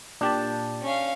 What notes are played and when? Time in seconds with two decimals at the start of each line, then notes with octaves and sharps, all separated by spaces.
0.21 A#2 D4 G4 A5
0.83 C#4 F5